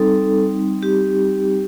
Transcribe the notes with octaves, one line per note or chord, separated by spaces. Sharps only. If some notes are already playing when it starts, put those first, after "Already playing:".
Already playing: G3 C4 D#4 A4
G4